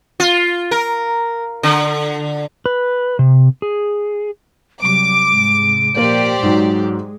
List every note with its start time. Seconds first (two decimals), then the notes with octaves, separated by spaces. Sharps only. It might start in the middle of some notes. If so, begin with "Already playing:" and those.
0.20 F4
0.71 A#4
1.63 D3
2.66 B4
3.19 C3
3.62 G#4
4.82 C3 F#3 G3 D6 D7
5.28 G#2 C3 G#3
5.97 A#2 F3 A#3 G4 C5 D5
6.42 G#2 F#3 G#3